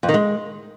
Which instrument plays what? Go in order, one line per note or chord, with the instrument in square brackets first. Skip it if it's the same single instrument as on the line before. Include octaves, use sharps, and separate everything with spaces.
[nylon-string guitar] F2
D#3
G#3